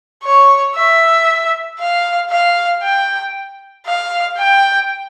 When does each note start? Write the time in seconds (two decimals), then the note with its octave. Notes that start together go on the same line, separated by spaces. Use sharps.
0.24 C#5
0.75 E5
1.79 F5
2.31 F5
2.83 G5
3.86 F5
4.38 G5